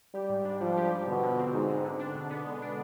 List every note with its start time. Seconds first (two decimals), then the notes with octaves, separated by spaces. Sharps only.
0.14 G3 G4
0.30 G#2
0.45 D4
0.60 F3 G3
0.77 G4
0.92 G#2
1.08 B2 D3
1.23 D3
1.38 C4
1.54 G#2 G#3
1.69 D3
1.84 D3
1.99 D4
2.15 B2
2.30 B3
2.46 G#3
2.62 D4